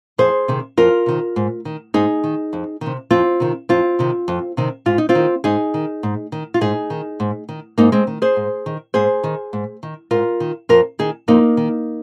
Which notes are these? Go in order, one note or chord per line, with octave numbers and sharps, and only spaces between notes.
F2 G#4 C5
C3 D#3
F2 F4 A#4
C3 D#3
G#2
D#3
G#2 D#4 G#4
D#3
F2
C3 D#3
F2 C4 F4
C3 D#3
F2 C4 F4
C3 D#3
F2
C3 D#3
G#2 F4
D#4
C4 F4
D#3
G#2 D#4 G#4
D#3
G#2
D#3
F4
G#2 D#4 G#4
D#3
G#2
D#3
G#2 A#3 D#4
G#3 C4
D#3
G#4 C5
G#2
D#3
G#2 G#4 C5
D#3
G#2
D#3
G#2 F4 A#4
D#3
F2 F4 A#4
D#3 D#4 G#4
F2 A#3 D#4
D#3